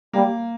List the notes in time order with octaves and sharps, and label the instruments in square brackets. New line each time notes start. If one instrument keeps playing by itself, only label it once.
[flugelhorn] G3 [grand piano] A#3